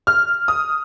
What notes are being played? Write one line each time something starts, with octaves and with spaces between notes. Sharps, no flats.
F6
D#6